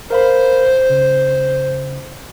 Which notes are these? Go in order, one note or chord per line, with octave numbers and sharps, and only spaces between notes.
A#4 C5 F5 B5
C#3